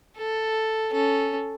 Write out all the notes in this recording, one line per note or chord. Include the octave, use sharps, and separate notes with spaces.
A4
C#4 A4